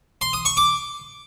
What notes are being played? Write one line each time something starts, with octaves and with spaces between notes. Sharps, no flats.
C6
D#6
C#6
D6